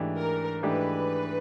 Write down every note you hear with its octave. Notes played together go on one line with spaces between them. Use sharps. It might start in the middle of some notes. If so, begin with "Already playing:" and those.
Already playing: G#2 E3 A3 D4 G4
A#4
G#2 E3 A3 D4 G4 B4